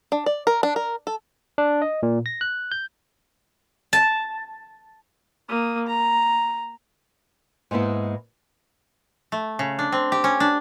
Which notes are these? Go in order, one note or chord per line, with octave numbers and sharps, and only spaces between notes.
D4
D5
A#4
D4
A#4
A4
D4
D#5
A#2
A#6
F#6
G6
A5
A#3 D#6
A#5
G#2 G#3 A#3 B3 E4
A3
C#3
D4
C4
G4
C#4
D4